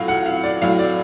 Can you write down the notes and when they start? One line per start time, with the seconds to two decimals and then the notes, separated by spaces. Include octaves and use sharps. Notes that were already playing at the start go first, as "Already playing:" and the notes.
Already playing: A2 F#3 F5
0.08 F#5
0.26 F5
0.44 D5
0.62 A2 F#3 F5
0.79 D5